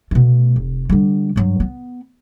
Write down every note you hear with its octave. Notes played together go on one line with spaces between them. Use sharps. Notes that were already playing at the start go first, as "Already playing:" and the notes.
B2 A3
F1
D3 G3
G2 F#3
B3